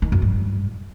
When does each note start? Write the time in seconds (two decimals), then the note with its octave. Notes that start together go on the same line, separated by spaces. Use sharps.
0.02 D#3
0.12 F#2
0.22 G2